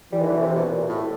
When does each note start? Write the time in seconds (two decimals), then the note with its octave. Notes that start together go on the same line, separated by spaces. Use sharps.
0.12 E3 G3
0.21 D#3
0.27 D3
0.35 B2
0.41 C3
0.55 B2
0.70 A#2
0.89 A2